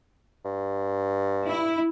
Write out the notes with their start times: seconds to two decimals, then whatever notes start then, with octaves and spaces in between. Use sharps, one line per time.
0.45 G2
1.48 E4